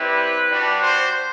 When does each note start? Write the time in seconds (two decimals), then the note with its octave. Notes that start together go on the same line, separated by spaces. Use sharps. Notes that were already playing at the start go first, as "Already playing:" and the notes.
Already playing: G3 C4 E4 G4 B4
0.50 G3 D4 F#4
0.83 C5